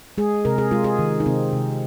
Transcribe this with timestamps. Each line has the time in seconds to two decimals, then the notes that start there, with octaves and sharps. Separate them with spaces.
0.18 G#3 G#4
0.45 C3 A#4
0.58 G#4
0.71 G#3 F4
0.84 G#4
0.99 D#3
1.20 D#4
1.26 C3 C4
1.53 C3